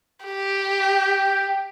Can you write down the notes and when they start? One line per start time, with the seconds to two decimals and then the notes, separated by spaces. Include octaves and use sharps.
0.24 G4
0.82 G5